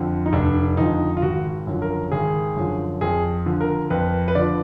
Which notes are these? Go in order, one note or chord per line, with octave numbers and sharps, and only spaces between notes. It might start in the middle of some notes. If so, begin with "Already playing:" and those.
Already playing: F2 D3 F3
D#4
F1 D4
F2 D3 F3 D#4
F4
G#1 F#4
F#2 D3 F3
A#4
G#1 G#4
F#2 D3 F3
F2 G#4
D3 F3
A#4
F2 B4
B4
D3 F3 D5